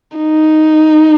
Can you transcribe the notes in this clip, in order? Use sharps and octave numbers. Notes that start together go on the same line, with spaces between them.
D#4